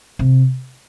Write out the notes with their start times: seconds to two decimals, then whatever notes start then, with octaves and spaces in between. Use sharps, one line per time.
0.19 C3